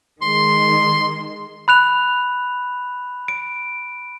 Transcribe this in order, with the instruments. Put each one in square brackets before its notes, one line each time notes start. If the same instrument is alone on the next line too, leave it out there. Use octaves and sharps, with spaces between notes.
[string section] D#3 G#3 [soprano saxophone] C6
[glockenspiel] B5 F#6 F7
D7